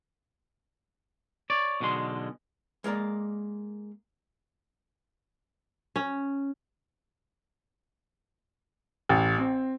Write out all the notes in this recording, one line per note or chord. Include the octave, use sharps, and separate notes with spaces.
C#5 D5
B1 B2 D3 G#3 C6
G#3 A#3 A#4 D5
C#4
A1
C4